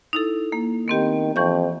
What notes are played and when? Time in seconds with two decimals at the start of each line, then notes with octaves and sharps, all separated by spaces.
0.13 D#4 E4 A4
0.52 A#3
0.88 D#3 B3 C4 G4
1.36 F2 E3 C#6 G6